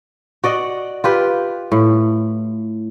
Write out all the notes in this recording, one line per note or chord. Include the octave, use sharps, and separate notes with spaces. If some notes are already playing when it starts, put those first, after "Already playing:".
F#4 D5 D#5 F#5
F4 G4 B4
A2